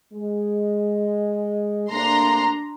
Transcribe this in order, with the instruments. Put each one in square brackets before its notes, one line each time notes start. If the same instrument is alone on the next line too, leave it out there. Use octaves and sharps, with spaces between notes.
[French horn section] G#3
[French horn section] C3 A3 A#3 [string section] D4 A#5 C6